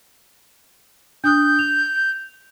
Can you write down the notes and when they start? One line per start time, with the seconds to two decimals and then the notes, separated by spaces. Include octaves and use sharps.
1.24 D4 D#6 F#6 G6
1.59 F7